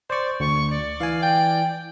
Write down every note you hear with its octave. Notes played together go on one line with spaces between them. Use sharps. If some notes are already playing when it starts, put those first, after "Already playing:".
C5 D5 C#6
D2 C#6
D5
E3 F5 G#5
G5